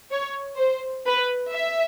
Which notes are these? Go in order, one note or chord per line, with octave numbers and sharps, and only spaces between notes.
C#5
C5
B4
E5